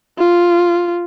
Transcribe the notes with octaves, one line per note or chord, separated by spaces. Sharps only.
F4